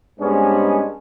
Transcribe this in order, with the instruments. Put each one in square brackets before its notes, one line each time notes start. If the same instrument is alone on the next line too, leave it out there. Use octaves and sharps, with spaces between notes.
[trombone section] G#2 G3 G#3 B3 C#4 D4